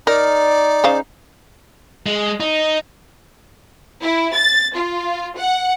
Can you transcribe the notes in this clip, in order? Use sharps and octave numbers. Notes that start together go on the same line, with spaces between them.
D#4 A#4 D5
C#3 C5 F5
G#3
D#4
E4
A6
F4
F#5